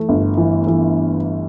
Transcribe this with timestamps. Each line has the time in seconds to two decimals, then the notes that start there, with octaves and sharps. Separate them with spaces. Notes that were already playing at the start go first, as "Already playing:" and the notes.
Already playing: E3 A3
0.09 G1
0.37 E3
0.67 E3